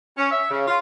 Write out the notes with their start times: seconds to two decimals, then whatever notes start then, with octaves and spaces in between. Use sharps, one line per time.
0.17 C#4
0.31 E5
0.51 C#3
0.68 F4